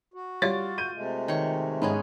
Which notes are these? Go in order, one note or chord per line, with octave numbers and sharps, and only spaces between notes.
F#4
G3 F4 C#5 D6 A6
G6 D#7
C3 G#3 A3
D#3 C#5 C#6
G#2 B3 C#4 G#4